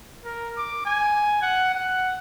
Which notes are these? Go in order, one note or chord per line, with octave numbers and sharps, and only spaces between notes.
A#4
D6
G#5
F#5
F#5